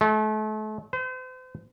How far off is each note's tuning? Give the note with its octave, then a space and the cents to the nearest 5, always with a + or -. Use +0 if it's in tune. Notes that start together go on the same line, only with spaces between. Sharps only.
A3 -35
C5 -40